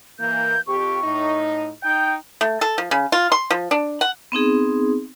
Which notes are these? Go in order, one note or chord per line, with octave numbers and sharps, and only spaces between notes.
E3 A#3 G6
F2 G4 C#6
A2 D#4
D#4 G5 G6
A3
A4
F3
C#3
F4
C6
F3
D4
F#5
B3 C4 D#4 G#4